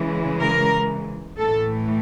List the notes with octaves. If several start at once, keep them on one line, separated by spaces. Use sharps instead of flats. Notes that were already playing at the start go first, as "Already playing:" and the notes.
Already playing: C#3 E3 G#3
A#4
A2 E3 A3 A4